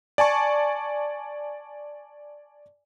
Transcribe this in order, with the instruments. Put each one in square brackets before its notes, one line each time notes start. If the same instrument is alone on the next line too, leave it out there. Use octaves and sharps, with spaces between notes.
[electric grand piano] D5 G#5 A5 C#6